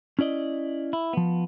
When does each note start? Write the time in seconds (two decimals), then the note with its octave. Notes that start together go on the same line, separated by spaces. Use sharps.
0.19 C#4 E4 D5 D#5
0.93 E4
1.13 F3 B3